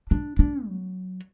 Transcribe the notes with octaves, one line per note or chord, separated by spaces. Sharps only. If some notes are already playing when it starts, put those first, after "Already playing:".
D4
D4
F#3